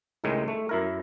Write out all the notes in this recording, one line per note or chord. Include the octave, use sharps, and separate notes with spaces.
C#2 A2 D#3 G#3
A3
F#2 E4 A#4